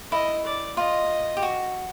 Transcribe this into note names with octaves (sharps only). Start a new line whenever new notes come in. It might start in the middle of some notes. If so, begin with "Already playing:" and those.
E4 D#5
D5
F4 D#5
G4
F#4